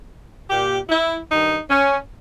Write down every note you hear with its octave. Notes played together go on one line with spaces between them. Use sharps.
A#2 G4
E4
G2 D#3 D#4
C#4